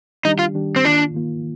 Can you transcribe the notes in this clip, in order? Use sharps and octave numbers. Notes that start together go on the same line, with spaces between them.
D#3 G3 D4 D#4 G4
F4
D#3 G3 D4 G4
C4
D#3 A#3 D4 F4
D#3 A#3 F4